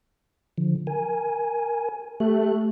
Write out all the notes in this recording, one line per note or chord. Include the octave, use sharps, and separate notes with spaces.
D3 F3
A#4 G#5
A3 G4 F#6